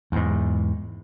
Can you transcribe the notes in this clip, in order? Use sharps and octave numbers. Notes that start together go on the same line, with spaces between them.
E2 G#2